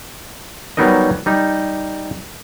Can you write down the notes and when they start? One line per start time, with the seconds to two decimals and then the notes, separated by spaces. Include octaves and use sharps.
0.77 F#3 G3 B3 D#4 A#4 D#5
1.26 G3 D#4